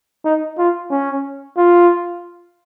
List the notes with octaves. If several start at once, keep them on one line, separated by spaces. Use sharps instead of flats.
D#4
F4
C#4
F4